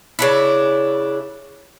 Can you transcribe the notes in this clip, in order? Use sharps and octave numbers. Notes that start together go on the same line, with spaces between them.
C#3 D4 E4